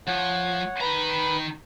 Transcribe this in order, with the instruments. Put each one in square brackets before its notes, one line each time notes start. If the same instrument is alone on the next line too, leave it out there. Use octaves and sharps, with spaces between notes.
[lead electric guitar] F3 [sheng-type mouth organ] C#5 F#5
[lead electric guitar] D#3 A#5 [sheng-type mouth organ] B4 B5